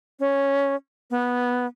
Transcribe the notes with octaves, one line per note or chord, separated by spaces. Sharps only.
C#4
B3